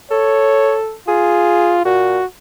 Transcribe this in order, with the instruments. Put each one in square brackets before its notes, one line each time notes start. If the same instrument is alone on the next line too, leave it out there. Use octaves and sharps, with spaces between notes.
[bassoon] A4 [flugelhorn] C#5
[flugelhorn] F4 [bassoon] G#4
[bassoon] A#2 [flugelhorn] F#4